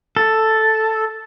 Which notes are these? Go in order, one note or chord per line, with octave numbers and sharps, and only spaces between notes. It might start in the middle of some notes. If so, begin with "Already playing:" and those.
A4